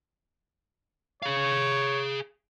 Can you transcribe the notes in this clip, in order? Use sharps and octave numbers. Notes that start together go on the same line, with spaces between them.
G#4 C#5 F5